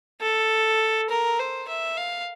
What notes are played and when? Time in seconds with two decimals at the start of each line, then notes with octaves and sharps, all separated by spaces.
0.21 A4
1.10 A#4
1.39 C5
1.68 E5
1.97 F5